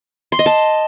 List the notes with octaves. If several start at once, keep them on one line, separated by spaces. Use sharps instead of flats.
C6
D#5
A5